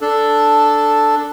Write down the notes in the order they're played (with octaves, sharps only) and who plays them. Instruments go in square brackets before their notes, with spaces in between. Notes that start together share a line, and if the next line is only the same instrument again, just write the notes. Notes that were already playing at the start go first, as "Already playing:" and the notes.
[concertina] D4 A4